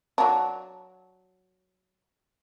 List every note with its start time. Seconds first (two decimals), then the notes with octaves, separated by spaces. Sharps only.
0.18 F#3 D4